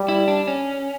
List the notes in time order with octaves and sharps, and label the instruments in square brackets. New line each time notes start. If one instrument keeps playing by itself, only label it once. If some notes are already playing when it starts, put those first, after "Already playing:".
Already playing: [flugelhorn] G3
[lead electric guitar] E4
D4
C#4